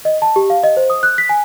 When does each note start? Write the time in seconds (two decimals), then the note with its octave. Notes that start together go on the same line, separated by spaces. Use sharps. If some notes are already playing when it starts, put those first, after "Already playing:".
0.05 D#5
0.22 A5
0.36 G4
0.50 F5
0.63 D#5
0.77 C5
0.90 D#6
1.03 F#6
1.18 B6
1.29 G#5